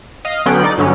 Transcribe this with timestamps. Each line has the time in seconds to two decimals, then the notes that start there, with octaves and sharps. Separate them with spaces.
0.25 D#5 F5
0.46 D3 F#3 B3 C#4 G5 F#6
0.63 D#4 D5
0.78 G2 D3 F#3 C#4